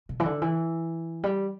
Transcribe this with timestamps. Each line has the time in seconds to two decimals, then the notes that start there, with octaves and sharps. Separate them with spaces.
0.09 B2
0.20 E3
0.25 D3
0.42 E3
1.24 G3